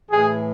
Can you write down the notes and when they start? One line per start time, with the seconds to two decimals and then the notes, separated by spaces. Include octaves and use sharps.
0.11 A2 E3 G#4